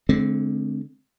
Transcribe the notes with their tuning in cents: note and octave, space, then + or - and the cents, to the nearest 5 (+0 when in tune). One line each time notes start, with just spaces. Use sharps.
D3 +0 G#3 +40 C4 -5